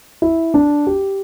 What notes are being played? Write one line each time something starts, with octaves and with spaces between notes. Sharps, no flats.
E4
D4
G4